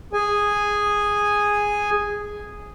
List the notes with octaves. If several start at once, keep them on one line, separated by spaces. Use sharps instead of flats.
G#4 G#5